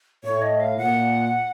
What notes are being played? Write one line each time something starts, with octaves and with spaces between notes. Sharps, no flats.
A2 C#5
D#5
F5
A#2 F#5